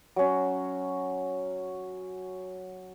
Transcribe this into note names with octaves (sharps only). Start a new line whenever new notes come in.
F#3 C#4